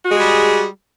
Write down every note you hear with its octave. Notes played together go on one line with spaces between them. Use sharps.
G3 G#3 F#4 G#4